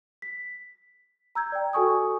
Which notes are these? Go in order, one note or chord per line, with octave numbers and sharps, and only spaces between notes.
B6
A#5 E6 G6 G#6
D5 G5
F#4 A4 G#5 C#6 D#6